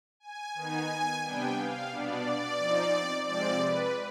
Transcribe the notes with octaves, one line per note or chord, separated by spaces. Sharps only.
G#5
D#3 B3 D#4 G#5
C3 G3 B3 D4 G5
F5
B2 B3 D4 D5
F3 C4 D#4
C3 F3 G#3 C4 D5
B4